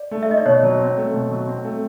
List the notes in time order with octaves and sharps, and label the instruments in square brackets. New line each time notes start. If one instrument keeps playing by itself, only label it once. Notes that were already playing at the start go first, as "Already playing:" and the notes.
Already playing: [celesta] D5
[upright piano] A3
[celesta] E5
[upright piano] D#4 [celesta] D#5
[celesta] D5
[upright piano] B2 [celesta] C#5
[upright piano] F#3
C4
A3
B2
F#3
C4
A3